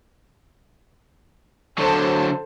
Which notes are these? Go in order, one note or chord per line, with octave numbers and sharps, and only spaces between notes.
D3 F#3 A4 C5 A5